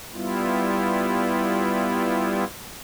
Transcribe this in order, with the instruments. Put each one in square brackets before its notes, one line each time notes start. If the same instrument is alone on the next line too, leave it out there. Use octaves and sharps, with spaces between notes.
[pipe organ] G3 B3 E4 F4